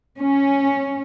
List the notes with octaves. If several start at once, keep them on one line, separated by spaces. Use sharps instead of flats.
C#4